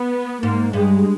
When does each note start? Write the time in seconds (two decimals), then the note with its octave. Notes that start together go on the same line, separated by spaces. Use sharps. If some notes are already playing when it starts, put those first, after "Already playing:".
Already playing: B3
0.43 G#2 A#3
0.73 G2 G#3